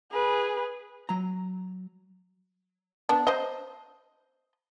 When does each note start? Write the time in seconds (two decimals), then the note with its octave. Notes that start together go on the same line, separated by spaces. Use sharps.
0.12 G#4 B4
1.09 F#3 A#5
3.09 B3 D4
3.27 C5 D#5